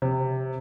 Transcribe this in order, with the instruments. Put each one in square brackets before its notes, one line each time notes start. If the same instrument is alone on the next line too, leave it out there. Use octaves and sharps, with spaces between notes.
[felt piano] C3